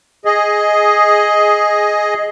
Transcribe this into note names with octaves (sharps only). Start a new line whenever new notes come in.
G#4 D#5